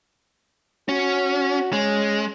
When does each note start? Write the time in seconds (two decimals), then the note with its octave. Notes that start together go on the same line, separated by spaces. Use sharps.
0.89 C#4 F#4
1.73 G#3 C#4